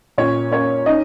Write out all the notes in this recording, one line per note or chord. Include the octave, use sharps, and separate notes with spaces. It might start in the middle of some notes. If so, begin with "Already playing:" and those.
A#2 C#4 C#5
A#3 C#4 C#5
C#4 D#4 D#5